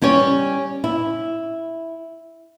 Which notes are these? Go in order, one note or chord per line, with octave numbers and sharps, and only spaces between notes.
G3 C#4 G4 C#5
E4